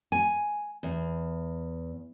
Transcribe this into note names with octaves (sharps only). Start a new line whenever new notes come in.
G#5
E2